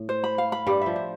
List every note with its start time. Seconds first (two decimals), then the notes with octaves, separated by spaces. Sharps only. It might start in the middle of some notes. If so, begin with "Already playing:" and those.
Already playing: A2
0.09 C5
0.24 B5
0.38 F5
0.52 B5
0.67 G2 G3 G4
0.82 F3 E5
0.96 C5